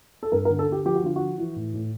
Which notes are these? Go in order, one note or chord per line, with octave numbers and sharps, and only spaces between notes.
A4
G2 A#4
A#4
D3
A4
D3 G4
F3 G4
F#4
D3 F4
F3 F#4
E3
A2
A2